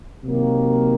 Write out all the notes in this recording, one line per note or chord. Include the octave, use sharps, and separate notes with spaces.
C3 D#3 F#3 A#3